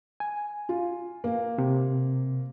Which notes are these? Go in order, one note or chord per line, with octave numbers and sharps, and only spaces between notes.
G#5
F4
A#3
C3